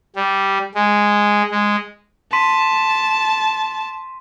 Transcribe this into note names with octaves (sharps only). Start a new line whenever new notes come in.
G3
G#3
G#3
A5 C6 B6 D#7